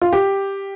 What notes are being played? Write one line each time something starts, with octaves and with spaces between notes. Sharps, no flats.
F4
G4